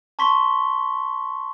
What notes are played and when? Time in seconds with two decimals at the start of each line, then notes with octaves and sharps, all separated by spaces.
0.19 A5 C6 C#6 B6 G7